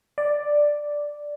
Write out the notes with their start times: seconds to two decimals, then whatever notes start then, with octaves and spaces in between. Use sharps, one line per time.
0.18 D5